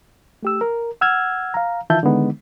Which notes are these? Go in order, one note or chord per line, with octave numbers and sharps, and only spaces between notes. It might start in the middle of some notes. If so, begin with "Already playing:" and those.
A3 G4 E6
A#4
F#5 E6 F6 G#6
F5 A#5
D#3 E3 F4 E5 A5 G6
D3 D#3 G#3 B3 D#4